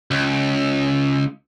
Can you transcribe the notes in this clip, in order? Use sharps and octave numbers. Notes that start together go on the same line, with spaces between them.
C#2